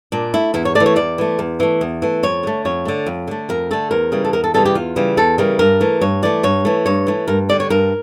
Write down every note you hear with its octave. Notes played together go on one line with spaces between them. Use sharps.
A#2 D4
A3 E4
E2 E4
C#5
A3 D5
E3
C#5
E2 D5
E3 A3
E2
E3 A3
E2
E3 A3
F2 C#5
D3 A3
F2 C#5
D3 A3
F2
D3 A3
F2 A#4
D3 A3 A4
E2 A#4
C#3 E3 G3
A4
E2 A#4
A4
C#3 E3 G3 A4
G4
E2 F4
C#3 E3 G3
E2 A4
C#3 E3 G3 A#4
G2 A#4
E3 A3
G2 C#5
E3 A3 D5
G2 C#5
E3 A3
G2 C#5
E3 A3
G2 A#4
D3 G3 D5
C#5
G2 A#4